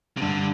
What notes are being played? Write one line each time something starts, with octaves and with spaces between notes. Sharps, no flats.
C3
G2 D3